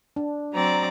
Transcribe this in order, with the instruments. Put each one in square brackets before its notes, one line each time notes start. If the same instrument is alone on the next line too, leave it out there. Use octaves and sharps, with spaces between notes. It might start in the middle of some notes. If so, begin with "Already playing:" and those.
[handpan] D4
[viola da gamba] F#3 C4 D5 [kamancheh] A#5